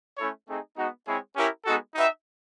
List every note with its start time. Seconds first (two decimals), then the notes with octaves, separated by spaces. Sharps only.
0.18 A3 C#4 E4 A4 C#5
0.48 A3 C4 D#4 G#4
0.77 G#3 B3 D#4 F#4
1.07 G#3 C4 E4 G#4 C#5
1.36 C#4 E4 G4 A#4
1.65 G#3 B3 D#4 F#4 A4
1.94 D#4 F#4 B4 E5 G5